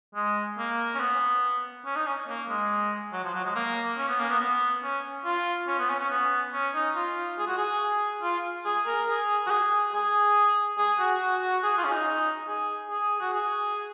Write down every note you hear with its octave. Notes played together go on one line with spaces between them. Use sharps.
G#3
A#3
C#4
B3
C#4
D#4
C#4
A#3
G#3
F#3
F3
F#3
G#3
A#3
C#4
B3
A#3
B3
B3
C#4
F4
C#4
B3
C#4
C#4
B3
C#4
D#4
F4
G#4
F#4
G#4
F4
G#4
A#4
G#4
F#4
G#4
G#4
G#4
F#4
F#4
F#4
G#4
F4
C#4
D#4
G#4
G#4
F#4
G#4